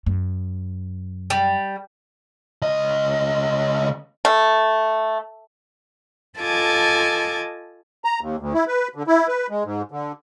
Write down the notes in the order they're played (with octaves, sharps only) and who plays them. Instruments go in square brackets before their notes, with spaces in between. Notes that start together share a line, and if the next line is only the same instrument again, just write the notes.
[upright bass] F#2
[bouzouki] G3
[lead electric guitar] C#2 D#5
[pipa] A3
[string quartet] F4 A4 D#5 G#5 A5 D6
[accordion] A#5
D#2
D2
E4
B4
D3
E4
B4
G#3
G#2
D3